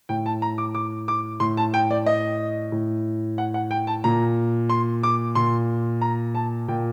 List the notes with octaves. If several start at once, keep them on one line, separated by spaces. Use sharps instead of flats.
A2 G5
A5
A#5
D6
D6
D6
A2 C6
A5
G5
D5
D#5
A2
F#5
F#5
G5
A5
A#2 A#5
C6
D6
A#2 C6
A#5
A5
A#2 G5